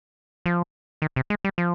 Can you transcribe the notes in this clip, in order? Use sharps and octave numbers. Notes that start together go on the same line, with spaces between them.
F3
D#3
C3
G#3
G3
F3